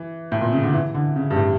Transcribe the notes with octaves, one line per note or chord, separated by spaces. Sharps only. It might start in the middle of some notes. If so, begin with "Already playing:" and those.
Already playing: E3
A2
A#2
C#3
D3
E3
D3
C#3
G2
A2